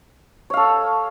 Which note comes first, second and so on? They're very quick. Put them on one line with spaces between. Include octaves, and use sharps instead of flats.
C#5 F5 A4